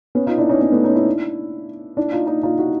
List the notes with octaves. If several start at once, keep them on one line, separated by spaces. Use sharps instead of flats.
B3 C#4
D#4 F4
D4 E4
C#4 D#4
B3 C#4
A3 B3
C#4 D#4
D4 E4
D4 E4
D#4 F4
D#4 F4
D#4 F4
E4 F#4